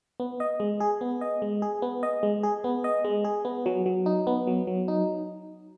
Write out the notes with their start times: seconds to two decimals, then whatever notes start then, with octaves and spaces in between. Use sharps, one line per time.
0.20 B3
0.40 D#5
0.60 G#3
0.80 G#4
1.01 B3
1.21 D#5
1.42 G#3
1.62 G#4
1.82 B3
2.03 D#5
2.23 G#3
2.43 G#4
2.64 B3
2.84 D#5
3.05 G#3
3.25 G#4
3.45 B3
3.66 F#3
3.86 F#3
4.06 D#4
4.27 B3
4.47 F#3
4.67 F#3
4.88 D#4